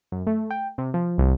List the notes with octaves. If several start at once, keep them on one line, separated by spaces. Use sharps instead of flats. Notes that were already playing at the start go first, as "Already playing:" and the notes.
F#2
A3
G5
C3
F3
C2